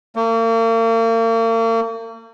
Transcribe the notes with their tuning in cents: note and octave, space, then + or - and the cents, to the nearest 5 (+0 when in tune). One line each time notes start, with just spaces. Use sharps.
A#3 -40